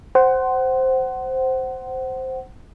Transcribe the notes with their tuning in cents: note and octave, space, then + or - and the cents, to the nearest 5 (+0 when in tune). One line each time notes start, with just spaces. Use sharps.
C5 +0 F#5 +25